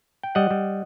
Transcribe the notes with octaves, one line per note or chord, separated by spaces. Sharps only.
G5
G3 D#5 F#5
G3